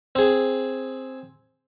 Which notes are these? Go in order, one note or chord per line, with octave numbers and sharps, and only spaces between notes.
C4 G#4